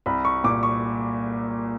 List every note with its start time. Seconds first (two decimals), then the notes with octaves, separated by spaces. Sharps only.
0.06 C2 B5
0.25 C#6
0.44 A#2 D6
0.63 C#6